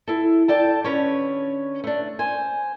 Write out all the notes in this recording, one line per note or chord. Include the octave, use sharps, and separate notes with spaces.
E4 A4
A4 D5 G5 A5
D3 C#4 B4 C#5
A3 D4
C5 G#5